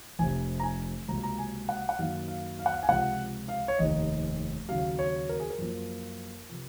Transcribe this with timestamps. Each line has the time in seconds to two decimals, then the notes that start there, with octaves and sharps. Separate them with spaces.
0.19 F1 F2 C3 G#5
0.60 A#5
0.63 G#5
1.08 C#2 C3 F#3 A#3 A#5
1.24 A#5
1.39 G#5
1.69 F#5
1.89 F#5
1.99 F#2 D#3 F#3 A#3 F5
2.28 F5
2.59 F5
2.66 F#5
2.73 F5
2.83 G#5
2.89 C#2 C3 F3 F#5
3.48 F5
3.68 C#5
3.78 F1 D#2 D#3 D#5
4.69 D#2 C#3 F#3 F5
4.99 C#5
5.29 A#4
5.40 G#4
5.50 A#4
5.58 F#2 F3 A#3
6.48 C3 F3